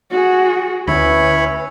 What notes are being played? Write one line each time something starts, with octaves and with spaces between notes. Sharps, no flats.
F#4 G#4
D2 C#4 E4 B4 C#5 B5